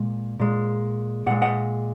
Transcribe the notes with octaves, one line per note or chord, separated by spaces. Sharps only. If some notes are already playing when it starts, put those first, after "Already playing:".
Already playing: A#2 G#3
A#2 G#3
A#2 G#3 F#5
D#5 F#5